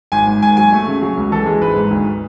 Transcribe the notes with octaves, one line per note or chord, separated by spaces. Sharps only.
G#1 G#5
G#2
G#1 G#5
F#3 G#5
A3
C#3
F#3
C#2
E3 A4
G#3
G#1 B4
G#2
D2